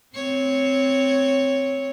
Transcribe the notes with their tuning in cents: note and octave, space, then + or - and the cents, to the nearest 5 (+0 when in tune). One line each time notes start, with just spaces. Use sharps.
C4 -5 C#5 +0